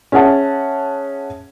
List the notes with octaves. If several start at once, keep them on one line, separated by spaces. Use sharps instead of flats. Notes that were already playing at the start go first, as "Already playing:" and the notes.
C#4 G#4 E5 F#5 A5